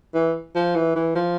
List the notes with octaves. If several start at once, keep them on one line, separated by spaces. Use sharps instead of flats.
E3
F3
E3
E3
F3